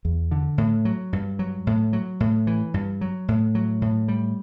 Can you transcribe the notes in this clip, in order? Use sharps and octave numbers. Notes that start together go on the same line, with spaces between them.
E2
D3
A2
F#3
G2
F#3
A2
F#3
A2
E3
G2
F#3
A2
F#3
A2
G3